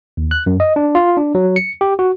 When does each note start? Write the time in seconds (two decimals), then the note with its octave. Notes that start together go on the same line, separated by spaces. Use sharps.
0.17 D#2
0.31 F#6
0.46 F#2
0.60 D#5
0.76 D4
0.95 F4
1.17 D4
1.35 F#3
1.56 C#7
1.81 G4
1.99 F#4